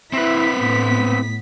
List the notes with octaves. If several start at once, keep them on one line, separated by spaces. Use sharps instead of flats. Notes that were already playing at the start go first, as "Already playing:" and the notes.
C4 E4 B4 B6
A2 B3